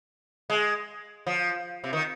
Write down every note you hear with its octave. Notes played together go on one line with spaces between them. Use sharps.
G#3
F3
C3
D#3